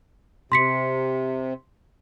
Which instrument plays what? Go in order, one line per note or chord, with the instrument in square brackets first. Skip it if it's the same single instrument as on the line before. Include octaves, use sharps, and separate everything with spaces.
[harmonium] C3 [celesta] C6 B6 C#7